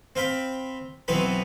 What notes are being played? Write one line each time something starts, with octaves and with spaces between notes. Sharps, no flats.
C4 F5 G5 B5
B1 E3 B3 C4 B5